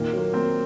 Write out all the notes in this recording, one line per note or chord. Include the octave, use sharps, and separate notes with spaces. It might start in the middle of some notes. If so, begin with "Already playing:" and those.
Already playing: A#2 D#3 A#3 C4
F#3 A#3
A#3 C4